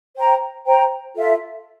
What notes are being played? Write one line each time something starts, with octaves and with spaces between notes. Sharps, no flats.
C5 G5 A#5
C5 G5 A#5
F4 A4 E5